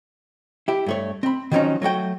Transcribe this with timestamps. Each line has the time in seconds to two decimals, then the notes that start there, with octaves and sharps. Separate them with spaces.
0.68 E4 G4
0.86 G2 A3 C#5
1.23 C4 B5
1.52 D#3 F3 F#3 A#3 C#4 D#4
1.82 F#3 A3 F#4 G5